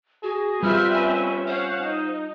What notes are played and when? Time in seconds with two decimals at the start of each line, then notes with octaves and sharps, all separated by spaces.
0.23 F#4 G#4
0.63 G3 C4 F4 B4 E5 F6
0.93 C#4 G#5
1.47 C5 F5 F#5
1.82 D#4